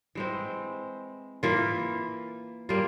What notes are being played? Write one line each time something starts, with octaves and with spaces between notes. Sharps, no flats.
E3 G#3 C4
E3 A#3 F4
G3 A#3 F4